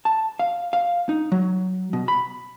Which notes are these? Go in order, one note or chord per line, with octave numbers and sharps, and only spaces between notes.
A5
F5
F5
D#4
F#3
B2
B5